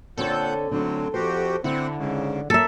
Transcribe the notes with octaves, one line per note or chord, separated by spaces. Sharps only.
A#2 D3 C4 A4 C#5 F#5 G6
A2 D3 F#3 C4 D4
F2 F#4 G4 C5
D3 C4 E4 F#5
G#2 C#3
A#3 A4 E5